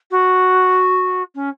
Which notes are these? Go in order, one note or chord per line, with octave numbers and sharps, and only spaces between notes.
F#4
C#4